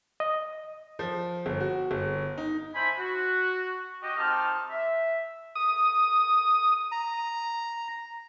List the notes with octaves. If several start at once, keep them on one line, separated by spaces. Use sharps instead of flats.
D#5
F3
G1
F#4
G1
D#4
D4 E4 C5 G#5 B5
F#4
F#4 G4 D#5
D#3 C4 D#4 G4 A5 F6
E5
D#6
A#5